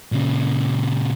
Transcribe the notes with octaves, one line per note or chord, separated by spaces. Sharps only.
A#2 C#3